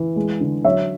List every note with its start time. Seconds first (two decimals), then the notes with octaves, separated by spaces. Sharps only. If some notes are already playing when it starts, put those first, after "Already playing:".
Already playing: E3
0.16 G#3
0.41 D3
0.65 F#3 C#5 E5